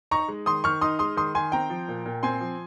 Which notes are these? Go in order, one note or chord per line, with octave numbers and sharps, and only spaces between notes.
D#4 A#5 C#6
G#3
D#3 C6 D#6
D#3 C#6 F6
D#4 C6 D#6
G#3 C6 D#6
D#3 C6 D#6
D#3 G#5 C6
C4 G5 A#5
F3
A#2
A#2
C4 G#5 C6
F3